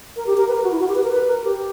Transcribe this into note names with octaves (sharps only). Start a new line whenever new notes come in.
A#4
G4
A#4
B4
A#4
F#4
E4
F#4
G4
B4
A#4
B4
A#4
G4